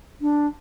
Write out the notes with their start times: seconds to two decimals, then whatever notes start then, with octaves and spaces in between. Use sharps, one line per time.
0.21 D4